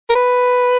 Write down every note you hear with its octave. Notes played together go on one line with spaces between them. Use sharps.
A#4
B4